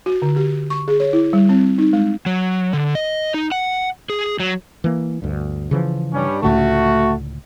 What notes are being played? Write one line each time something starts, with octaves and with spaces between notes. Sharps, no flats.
F#4
D3
G4
C#6
G#4
C#5
E4
G3
C4
D#4
G#3
F#3
D3
D#5
D#4
F#5
G#4
F#3
E3 A#3
D2 G2
C#3 E3 F3
G2 G3 C#4
C#2 A2 D3 A3 F#4